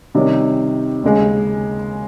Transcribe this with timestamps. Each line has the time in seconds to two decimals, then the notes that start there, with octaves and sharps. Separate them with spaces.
0.15 C3 D#3 G3 C#4
1.04 D#2 C#3 G#3